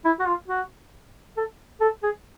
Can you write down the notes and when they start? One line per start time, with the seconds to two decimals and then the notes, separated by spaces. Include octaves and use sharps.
0.05 E4
0.20 F#4
0.26 F4
0.48 F#4
1.37 A4
1.81 A4
2.03 G#4